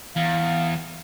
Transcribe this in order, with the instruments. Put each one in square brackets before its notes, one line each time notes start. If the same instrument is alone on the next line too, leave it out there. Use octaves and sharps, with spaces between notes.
[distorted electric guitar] E2 [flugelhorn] F5